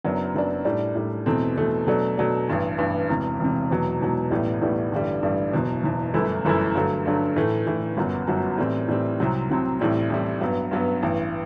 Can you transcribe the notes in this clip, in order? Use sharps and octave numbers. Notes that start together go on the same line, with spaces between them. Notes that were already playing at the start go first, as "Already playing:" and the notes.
F#1 F#2 F#3 B3 D4
F#1 F#2 F#3 B3 D4
A2 G3 D4
A2 G3 D4
E2 B2 A3 C4
E2 B2 A3 C4
B2 F#3 A3 D4
B2 F#3 A3 D4
A1 G2 E3
A1 G2 E3
E1 E2 C3
E1 E2 C3
E1 E2 B2 F#3
E1 E2 B2 F#3
A1 A2 G3 B3
A1 A2 G3 B3
A1 G2 D3 G3
A1 G2 D3 G3
F#1 E2 B2
F#1 E2 B2
G1 F#2 E3 A3 E4
G1 F#2 E3 A3 E4
G2 D3 F#3 A3
G2 D3 F#3 A3
A2 E3 A3
A2 E3 A3
G1 F#2 F#3 B3 F#4
G1 F#2 F#3 B3 F#4
A2 E3 G3 C4
A2 E3 G3 C4
C2 C3 F#3 C4
C2 C3 F#3 C4
A1 A2 G3 C4
A1 A2 G3 C4
G2 F#3 B3
G2 F#3 B3
A1 G2 E3